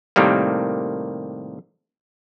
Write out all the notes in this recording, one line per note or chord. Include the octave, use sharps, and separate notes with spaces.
A2 C3 D#3 G3 A#3